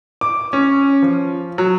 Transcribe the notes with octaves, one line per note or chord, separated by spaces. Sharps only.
D6
C#4
F3
F#3